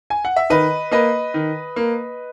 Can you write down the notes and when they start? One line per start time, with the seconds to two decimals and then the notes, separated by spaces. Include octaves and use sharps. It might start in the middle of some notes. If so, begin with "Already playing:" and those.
0.10 G#5
0.25 F#5
0.36 E5
0.50 D#3 B4 D#5
0.91 A#3 B4 D#5
1.34 D#3
1.76 A#3